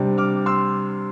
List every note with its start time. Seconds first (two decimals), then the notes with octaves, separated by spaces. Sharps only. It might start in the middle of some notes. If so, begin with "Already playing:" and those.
Already playing: C3 G3 D4
0.18 D6 F6
0.46 C6 E6